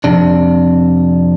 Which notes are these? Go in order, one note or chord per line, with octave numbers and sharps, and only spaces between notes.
F2 C3 D4